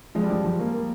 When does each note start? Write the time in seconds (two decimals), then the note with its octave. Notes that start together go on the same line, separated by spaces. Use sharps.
0.15 F3 G#3
0.23 G3
0.30 F3 G#3
0.44 F3
0.59 A#3
0.73 A#3